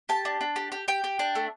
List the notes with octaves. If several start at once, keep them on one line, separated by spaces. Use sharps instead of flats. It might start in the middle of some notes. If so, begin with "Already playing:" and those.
G4 A5
D4
D4
G4
G4
G4 G5
G4
D4
A3